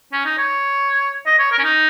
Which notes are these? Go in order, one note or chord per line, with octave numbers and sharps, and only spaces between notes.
C#4
D#4
C#5
D#5
C#5
A#4
C#4
D#4